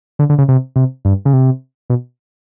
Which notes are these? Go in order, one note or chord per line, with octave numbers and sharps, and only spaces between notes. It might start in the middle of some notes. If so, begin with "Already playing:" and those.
D3
D3
C#3
C3
C3
G2
C#3
C3
B2